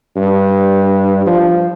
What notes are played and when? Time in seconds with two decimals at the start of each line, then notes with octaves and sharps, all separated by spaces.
0.16 G2
1.26 F3